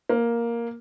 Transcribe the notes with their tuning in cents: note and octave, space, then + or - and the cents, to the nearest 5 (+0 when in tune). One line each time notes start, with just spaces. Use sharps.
A#3 +5